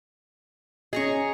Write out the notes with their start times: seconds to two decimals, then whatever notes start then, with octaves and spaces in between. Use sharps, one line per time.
0.93 C#4 G#4 D#5 A#5 C#6